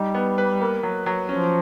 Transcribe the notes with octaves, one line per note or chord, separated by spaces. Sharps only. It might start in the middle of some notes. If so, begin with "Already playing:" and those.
Already playing: G3 D#4
B3
B4
A#3
F#3
F#3
F3 C#4